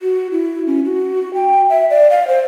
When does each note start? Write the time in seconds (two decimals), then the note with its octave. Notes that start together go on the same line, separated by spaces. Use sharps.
0.02 F#4
0.32 E4
0.67 C#4
0.85 F#4
1.34 G5
1.70 E5
1.90 D5
2.10 F5
2.28 C5